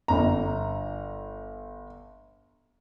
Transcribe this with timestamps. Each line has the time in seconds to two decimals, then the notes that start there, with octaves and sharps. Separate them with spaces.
0.08 G1 A#5